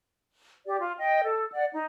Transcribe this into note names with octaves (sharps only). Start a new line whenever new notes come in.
G4 D5
F4
D#5 G5
A4
D5 F#5
D#4